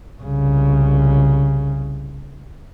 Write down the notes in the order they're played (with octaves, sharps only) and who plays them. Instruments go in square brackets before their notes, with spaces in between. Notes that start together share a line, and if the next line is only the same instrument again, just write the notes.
[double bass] C2 C#3